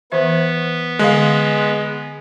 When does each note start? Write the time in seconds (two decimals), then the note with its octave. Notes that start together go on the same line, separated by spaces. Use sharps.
0.12 E3 B3 C5 E5
0.99 D3 G#3 F5